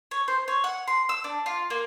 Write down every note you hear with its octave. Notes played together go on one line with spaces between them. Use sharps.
C#5
C5
C#5
F#5
C6
E6
D4
F4
A#3